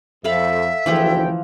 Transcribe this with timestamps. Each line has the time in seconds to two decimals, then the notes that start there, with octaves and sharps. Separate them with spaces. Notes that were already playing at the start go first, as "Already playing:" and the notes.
0.24 F2 A4 E5 F5 B5
0.86 F#1 D2 E3 F3 F4 G5